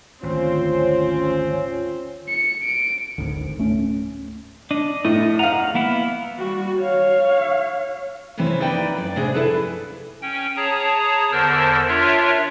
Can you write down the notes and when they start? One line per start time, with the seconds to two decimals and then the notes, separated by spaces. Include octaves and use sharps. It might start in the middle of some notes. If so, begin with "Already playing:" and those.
0.23 G#1 D2 C4 C#4 F4
2.29 C#7
2.64 D7
3.18 G#1 D2
3.58 D1 A3 C#4
4.71 D4 D#5
5.05 A2 D#5
5.39 F5 F#5 A#5
5.75 A#3 B3 E4
6.38 G3 F#4
6.78 C#5 F5
8.37 F#2 C3 E3 C4 C#4 E4
8.60 A#3 D#4 E4 B4 D5 G5
8.96 F#2 D5
9.16 A2 C3 D4 G#4
9.33 E4 A4 B4 F5
10.22 C#4 G5
10.56 G#4 C#5 A5 A#5 D#6
11.32 E2 D3 A#4 C5 A5 E6
11.88 D4 F4 A#4 C#5 E5